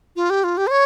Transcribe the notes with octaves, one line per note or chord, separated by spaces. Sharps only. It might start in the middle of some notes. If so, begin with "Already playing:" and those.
F4
G4
F4
G4
C5
C#5